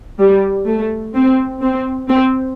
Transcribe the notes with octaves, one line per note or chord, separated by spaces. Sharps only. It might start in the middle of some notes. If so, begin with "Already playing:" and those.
G3
A3
C4
C4
C4